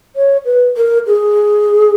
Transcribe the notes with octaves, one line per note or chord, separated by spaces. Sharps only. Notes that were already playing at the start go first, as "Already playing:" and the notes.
C#5
B4
A#4
G#4